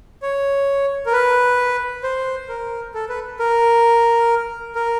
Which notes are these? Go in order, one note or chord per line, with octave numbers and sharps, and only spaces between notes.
C#5
A#4
B4
C5
A#4
A4
B4
A#4
A#4